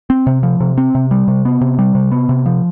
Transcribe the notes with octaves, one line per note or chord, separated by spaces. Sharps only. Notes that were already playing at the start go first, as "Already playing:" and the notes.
C4
C3
F3
C3
C4
C3
G3
C3
B3
C3
G3
C3
B3
C3
F3